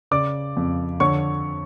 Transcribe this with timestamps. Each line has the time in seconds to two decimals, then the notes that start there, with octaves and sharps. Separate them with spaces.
0.11 C#3 D5 D6
0.57 F2
1.00 D3 C#5 C#6